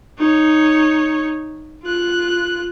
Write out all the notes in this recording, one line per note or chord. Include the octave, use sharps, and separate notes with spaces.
D#4 C#5
F4 F#6